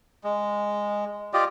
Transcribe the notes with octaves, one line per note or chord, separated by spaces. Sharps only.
G#3
F4 G4 D5 D#5